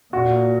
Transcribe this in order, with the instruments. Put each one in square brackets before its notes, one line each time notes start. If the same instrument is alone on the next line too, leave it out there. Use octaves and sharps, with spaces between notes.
[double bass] A#2 [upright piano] F#4